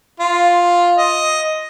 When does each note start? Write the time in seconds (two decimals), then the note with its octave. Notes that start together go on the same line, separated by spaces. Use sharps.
0.20 F4
0.98 D#5